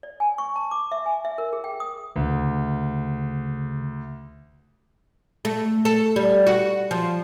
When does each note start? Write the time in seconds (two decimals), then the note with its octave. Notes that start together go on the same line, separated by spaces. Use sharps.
0.03 D5
0.20 G#5
0.38 C#6
0.56 A5
0.71 D6
0.92 E5
1.06 G#5
1.25 E5
1.38 A#4
1.53 G#4
1.64 G5
1.80 D#6
2.16 D2 C#3
5.45 A3
5.85 A4
6.16 G3
6.47 F#4
6.91 F3